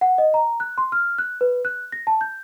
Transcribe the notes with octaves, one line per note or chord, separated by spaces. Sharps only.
F#5
D#5
A#5
F#6
C6
F6
F#6
B4
F#6
A#6
A5
G6